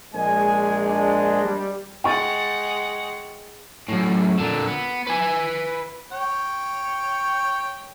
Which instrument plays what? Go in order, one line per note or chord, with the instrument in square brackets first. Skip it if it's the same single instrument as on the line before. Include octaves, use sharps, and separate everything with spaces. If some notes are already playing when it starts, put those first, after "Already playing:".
[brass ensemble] A#1 G#3 [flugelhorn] G#5
[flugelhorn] D4
[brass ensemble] G3
[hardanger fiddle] G#3 F#5 [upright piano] G5 C#6 A6
[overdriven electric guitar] F#2 A2
A#2 D3
B3
B4 G#5
[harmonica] C#5 G5